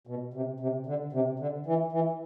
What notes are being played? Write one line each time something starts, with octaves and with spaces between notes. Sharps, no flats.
B2
C3
C3
D3
C3
D3
E3
E3